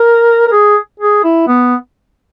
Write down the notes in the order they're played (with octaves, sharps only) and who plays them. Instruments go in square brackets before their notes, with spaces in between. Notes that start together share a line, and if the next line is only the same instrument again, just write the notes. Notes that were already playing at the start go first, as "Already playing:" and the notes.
Already playing: [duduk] A#4
A#4
G#4
G#4
E4
B3